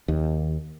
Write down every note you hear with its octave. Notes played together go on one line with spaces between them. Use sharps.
D#2